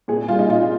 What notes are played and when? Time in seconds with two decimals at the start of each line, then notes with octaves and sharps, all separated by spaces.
0.08 A#2 G#4
0.28 G3 F4
0.39 D#4
0.48 A#2 F4